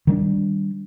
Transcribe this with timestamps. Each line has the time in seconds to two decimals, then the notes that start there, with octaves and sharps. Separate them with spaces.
0.07 D#3 G3 A3 D4